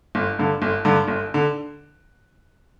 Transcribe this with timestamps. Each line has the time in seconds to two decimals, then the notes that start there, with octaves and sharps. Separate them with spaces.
0.15 G1
0.39 G2 D3
0.62 G1
0.85 G2 D3
1.08 G1
1.34 D3